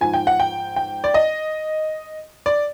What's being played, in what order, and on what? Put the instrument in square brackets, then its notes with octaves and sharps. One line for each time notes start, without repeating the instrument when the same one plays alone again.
[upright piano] G#2 F3 G#5
G5
F#5
G5
G5
D5
D#5
D5